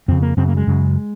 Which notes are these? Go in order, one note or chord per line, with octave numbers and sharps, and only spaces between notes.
F2 C#3 C4
A#3
F#2 C#3 C4
A#3
G#3
F#2 C#3